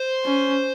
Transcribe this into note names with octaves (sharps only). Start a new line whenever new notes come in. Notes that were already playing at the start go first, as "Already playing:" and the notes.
Already playing: C5
C#4